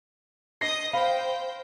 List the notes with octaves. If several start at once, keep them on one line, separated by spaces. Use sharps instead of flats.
D#5 D#6 A#6 C7
C5 F5 G5 B5